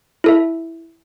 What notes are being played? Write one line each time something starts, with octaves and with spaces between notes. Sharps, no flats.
E4 A4 E5